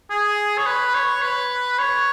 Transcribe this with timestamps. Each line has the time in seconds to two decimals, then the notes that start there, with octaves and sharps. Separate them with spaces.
0.10 G#4
0.58 C#5
0.66 B4
0.95 C#5
1.22 B4
1.79 C#5